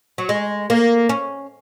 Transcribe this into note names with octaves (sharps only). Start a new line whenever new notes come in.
F#3
G#3
A#3
C#4